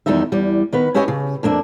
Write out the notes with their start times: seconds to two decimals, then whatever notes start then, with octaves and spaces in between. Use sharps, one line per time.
0.06 E2 D#3 G3 D#4 E5
0.32 E2 G3
0.73 D#3 B3 B4
0.94 C#4 E4 G4 C#5 D#5 G#5
1.08 C#3
1.43 F2 A#3 D4 E5